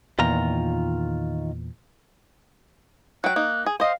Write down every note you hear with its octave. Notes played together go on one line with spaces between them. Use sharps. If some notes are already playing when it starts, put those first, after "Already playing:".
E2 A#2 D#3 F4 A#5
F#3 G5 F#6
A#3 D#4
G#4
C5 D#5 F5